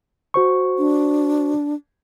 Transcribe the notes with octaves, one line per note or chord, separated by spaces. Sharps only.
F#4 C5 C#6
D4